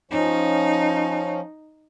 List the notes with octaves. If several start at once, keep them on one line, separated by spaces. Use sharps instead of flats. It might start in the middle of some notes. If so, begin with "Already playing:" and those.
F3 C#4 D#4